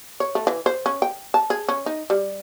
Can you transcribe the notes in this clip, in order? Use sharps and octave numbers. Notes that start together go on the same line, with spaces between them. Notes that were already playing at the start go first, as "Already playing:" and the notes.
C#5
A3
E3
C5
C#4
G5
A5
G#4
C#4
D#4
G3